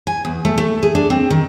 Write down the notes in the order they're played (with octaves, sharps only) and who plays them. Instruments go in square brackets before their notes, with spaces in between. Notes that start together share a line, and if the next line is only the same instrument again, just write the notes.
[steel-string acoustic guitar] G#5
E2
A3
A3
G#4
D4
C4
D#3